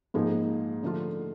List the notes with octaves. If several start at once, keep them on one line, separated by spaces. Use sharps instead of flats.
G#2 F3 A#3 D#4 G#4
D3 F3 A3 D4 F4